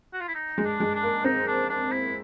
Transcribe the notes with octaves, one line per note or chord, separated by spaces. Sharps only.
F#4
F4
E4
D#4
G#3
D4
G#3
D4
A#3
C4 D#4
D4
D4
E4